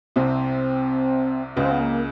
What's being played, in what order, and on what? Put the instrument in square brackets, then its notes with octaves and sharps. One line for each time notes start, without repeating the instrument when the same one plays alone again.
[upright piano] C2 C3 [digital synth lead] C4
[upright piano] C#2 C#3 [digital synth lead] B3
[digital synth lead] C4
B3
A#3